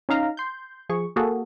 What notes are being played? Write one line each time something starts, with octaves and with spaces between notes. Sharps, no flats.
C#4 D#4 F5 A#5
C6 G6
F3 G#4 C#6
A#3 F#4 G#4 A4